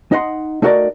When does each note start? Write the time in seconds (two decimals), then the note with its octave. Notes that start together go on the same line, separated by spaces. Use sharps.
0.12 D#4 D#5 F#5 C6
0.62 A3 D#4 F#4 A#4 C#5 D5